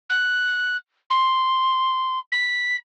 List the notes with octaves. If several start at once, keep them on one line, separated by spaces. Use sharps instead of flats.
F#6
C6
B6